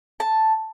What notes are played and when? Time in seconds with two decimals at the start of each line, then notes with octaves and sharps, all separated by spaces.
0.20 A5